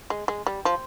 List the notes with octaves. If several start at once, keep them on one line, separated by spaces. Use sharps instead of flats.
G#3
G#3
G3
F3